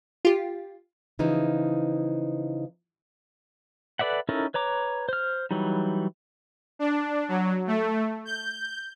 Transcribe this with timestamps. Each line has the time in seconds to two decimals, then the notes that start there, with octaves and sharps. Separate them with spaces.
0.25 F4 G4
1.19 C#3 E3 F3 D#4
3.99 A4 B4 D5 E5 F#5
4.29 C#4 D#4 E4 A4 A#4
4.54 B4 C#5 A#5 D6
5.09 C5 F6
5.51 E3 F#3 G3 D#4
6.79 D4
7.29 F#3
7.67 A3
8.25 G6